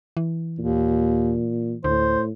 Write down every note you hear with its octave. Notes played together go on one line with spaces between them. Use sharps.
E3
D#2 A#2
D2 A2 C5